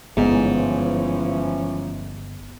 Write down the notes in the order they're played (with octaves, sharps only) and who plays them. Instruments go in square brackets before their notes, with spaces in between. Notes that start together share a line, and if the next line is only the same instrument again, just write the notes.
[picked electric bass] G1 [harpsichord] G#2 [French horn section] E3 F3 C#4 [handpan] B3 G#4